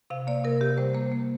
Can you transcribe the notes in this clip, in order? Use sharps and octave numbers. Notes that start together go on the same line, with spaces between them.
C3 F5
A#3 D5
C3 A#4
C3 G4
G3 C5
A#3 C5
A#3